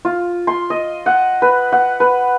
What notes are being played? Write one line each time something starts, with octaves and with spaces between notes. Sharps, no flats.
F4
C6
D#5
F#5
B4
F#5
B4